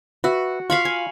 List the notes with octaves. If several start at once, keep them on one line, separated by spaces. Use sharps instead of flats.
F#4 B4 E5
F4 F5 B5 C#6
G#5